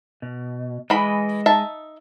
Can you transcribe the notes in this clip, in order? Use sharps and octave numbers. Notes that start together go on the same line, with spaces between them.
B2
E3 G#3 D#5 B5
D#4 E5 A5